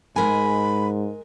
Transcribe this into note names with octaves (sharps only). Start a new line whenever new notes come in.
G#2 G#3 A#4 G#5 B5